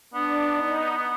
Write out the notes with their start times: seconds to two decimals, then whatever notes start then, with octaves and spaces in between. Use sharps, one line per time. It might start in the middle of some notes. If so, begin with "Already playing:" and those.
0.14 B3 D4
0.56 D#4